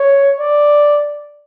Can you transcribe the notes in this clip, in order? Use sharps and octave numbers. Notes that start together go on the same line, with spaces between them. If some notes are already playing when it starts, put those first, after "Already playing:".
Already playing: C#5
D5